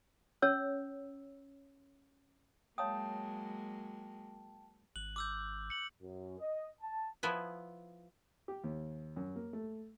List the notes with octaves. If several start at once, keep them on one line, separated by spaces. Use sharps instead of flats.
C#4 C#5 E6
F#3 G#3 A#3 C#5 F5 G5 A5 D#6
G#1 F#6 F#7
D6 E6 G6
C#7 F#7
F#2
D#5
A5
F3 B3 E4 G#5
G4
D#2
F#2
A#3
A3